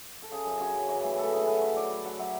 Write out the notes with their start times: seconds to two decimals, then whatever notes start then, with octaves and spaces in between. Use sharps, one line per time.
0.22 A4
0.32 C#3 G#4
0.46 F#2
0.60 C#3 F#4
0.75 F#2
0.89 E3 F#4
1.04 A2
1.18 E3 A4
1.33 A2 G#4
1.39 A4
1.47 F#3 B4
1.62 F#3 C#5
1.76 F#3 D5
1.91 F#3
2.05 F#3 F#5
2.19 F#3 E5